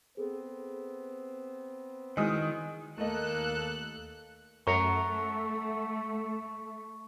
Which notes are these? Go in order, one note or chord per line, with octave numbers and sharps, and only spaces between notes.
B3 C4 G#4 A4
D#3 G#3 E4 F#4 G#5 D#6
D#2 A3 A#3 A4 D#5 F#6
F#2 A3 F#5 A#5 C#6